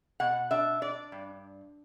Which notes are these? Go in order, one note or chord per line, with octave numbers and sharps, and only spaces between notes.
B2 F#5
D4 E5
D4 D5
G2